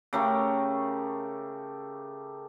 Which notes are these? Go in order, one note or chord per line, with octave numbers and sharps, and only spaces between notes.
C#3 A3 G4 A#4